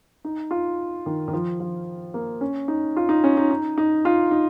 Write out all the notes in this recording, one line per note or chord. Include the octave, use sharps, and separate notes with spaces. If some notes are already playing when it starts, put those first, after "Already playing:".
D#4
F4
D#3
D#3
F3
F3
A#3
C#4
D#4
F4
D#4
C#4
D#4
D#4
D#4
F4
D#4